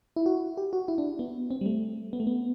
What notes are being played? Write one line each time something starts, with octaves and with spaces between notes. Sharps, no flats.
E4
F#4
G4
F#4
E4
D4
B3
C4
G3
A3
B3
A3
B3